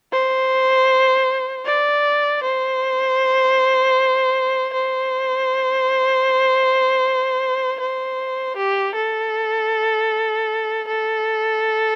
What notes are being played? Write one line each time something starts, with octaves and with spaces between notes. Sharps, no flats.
C5
D5
C5
C5
C5
G4
A4
A4